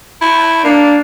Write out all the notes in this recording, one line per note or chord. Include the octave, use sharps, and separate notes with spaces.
E4
A#3 D4